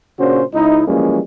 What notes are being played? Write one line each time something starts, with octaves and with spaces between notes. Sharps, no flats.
A#2 C#3 C#4 D4 F#4 C5
C#2 D#4 E4
E3 F3 G3 G#3 A#3 C#4